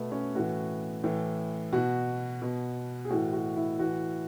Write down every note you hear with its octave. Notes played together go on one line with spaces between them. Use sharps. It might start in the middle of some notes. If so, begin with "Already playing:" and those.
Already playing: B2 A3 B3
C#4
A2 E3 F#4
A2 E3
B2 F#4
B2
G#4
A2 E3 F#4
F#4
E4
A2 E3 F#4